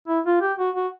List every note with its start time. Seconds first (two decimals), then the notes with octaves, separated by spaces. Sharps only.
0.08 E4
0.26 F4
0.41 G4
0.59 F#4
0.76 F#4